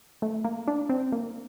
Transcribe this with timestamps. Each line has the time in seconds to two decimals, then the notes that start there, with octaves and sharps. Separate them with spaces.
0.22 A3
0.44 A#3
0.68 D4
0.89 C4
1.12 A#3